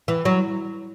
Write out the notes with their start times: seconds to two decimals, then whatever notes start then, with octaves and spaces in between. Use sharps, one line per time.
0.08 E3
0.25 F#3